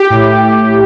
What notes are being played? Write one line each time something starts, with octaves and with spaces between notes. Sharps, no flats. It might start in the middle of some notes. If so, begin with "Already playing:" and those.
Already playing: G4
A2